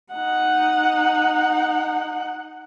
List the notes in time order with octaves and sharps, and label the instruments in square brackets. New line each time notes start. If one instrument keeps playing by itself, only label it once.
[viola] D#4 F#5